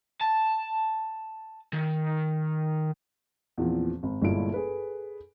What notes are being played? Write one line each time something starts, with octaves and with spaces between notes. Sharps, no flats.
A5
D#3
E2 A#2 E3 F3 C4
G#1
G1 G2 A#2 G#3 E4 D7
G#4 A4 B4